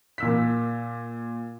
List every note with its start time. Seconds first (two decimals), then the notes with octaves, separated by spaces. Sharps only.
0.18 A#2 E6 B6